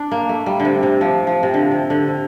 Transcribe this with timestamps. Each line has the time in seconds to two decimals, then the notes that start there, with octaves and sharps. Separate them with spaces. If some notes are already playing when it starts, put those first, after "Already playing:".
Already playing: D4
0.11 A#3
0.29 A3
0.46 G3
0.60 D3
0.65 C3
0.83 C3
1.01 F3
1.27 F3
1.43 C3
1.54 D3
1.71 C3
1.90 D3
2.08 C3